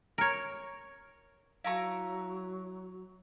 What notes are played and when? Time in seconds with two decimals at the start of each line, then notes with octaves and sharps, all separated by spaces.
0.18 A#4 C#5
1.64 F#3 E4 F5 A5 A#5 C#6